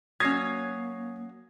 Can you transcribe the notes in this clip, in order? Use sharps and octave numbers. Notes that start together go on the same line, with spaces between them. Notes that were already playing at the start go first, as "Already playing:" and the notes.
F#3 A#3 C#4 D#6 G#6 A#6 C7